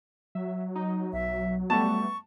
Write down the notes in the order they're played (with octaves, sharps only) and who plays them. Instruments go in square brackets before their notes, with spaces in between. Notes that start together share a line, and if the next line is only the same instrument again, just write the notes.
[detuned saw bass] F#3 [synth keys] E5
[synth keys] D#4
[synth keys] B1 [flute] E5
[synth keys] G3 A3 B3 [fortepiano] A5 [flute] C#6